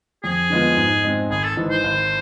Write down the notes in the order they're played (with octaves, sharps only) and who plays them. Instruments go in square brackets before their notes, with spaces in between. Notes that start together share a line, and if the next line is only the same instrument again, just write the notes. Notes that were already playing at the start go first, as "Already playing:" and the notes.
[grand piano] F2 [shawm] G#4
[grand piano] D3 G#3 B3 F4
G#2
G#3 C4
[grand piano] G#1 [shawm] G#4
[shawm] A4
[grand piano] G#2 E3
[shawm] C5
[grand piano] G#1